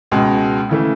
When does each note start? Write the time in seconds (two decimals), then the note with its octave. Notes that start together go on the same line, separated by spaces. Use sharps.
0.12 C#2 B2 G#3
0.69 C#3 E3 A3